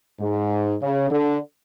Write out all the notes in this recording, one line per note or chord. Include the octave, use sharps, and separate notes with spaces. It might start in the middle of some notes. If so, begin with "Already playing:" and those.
G#2
C#3
D3